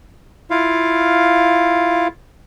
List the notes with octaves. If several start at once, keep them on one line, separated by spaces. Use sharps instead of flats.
E4 F4 F5